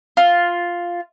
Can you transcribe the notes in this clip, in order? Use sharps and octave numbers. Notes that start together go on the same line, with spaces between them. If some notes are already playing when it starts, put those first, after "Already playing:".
F4